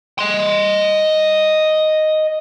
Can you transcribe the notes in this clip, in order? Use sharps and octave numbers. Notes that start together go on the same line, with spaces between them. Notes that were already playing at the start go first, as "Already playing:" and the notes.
D#5 C6